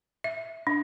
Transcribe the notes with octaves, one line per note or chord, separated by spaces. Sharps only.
E5
D4